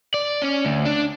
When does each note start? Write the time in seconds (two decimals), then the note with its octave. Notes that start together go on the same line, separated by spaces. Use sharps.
0.14 D5
0.42 C#4
0.65 D2
0.85 D4